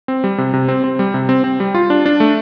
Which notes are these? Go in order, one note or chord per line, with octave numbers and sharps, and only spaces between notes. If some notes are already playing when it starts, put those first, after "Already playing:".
C4
G3
C3
C3
C4
C4
G3
C3
C4
C4
G3
F4
D4
D4
A3